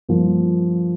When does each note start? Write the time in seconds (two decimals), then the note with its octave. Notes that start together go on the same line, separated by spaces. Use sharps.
0.09 G2 F3 A#3